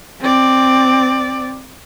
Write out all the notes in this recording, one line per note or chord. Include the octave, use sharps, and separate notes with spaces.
C4 D5